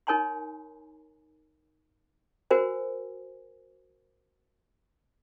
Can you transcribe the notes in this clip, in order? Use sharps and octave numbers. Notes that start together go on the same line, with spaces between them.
D#4 A#4 C#5 G#5 A#5 C6
F#4 A#4 C5 G#5